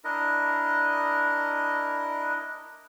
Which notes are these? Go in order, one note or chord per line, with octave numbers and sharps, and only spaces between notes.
D4 E4 A#4 D#5